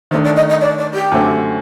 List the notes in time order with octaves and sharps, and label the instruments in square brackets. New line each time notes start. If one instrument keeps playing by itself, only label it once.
[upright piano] D#3 A3 D4 [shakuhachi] C5
[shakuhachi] D5
D#5
D#5
D5
D5
G4
[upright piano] F#2 D3 A3 C4